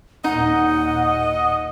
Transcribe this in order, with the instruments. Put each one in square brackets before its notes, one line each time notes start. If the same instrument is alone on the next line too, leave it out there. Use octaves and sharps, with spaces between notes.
[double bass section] D#2 A#2 [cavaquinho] D#4 [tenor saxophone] D#5 [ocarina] F#5